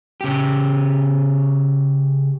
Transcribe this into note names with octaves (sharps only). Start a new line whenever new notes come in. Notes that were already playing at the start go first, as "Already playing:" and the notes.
C#3 G4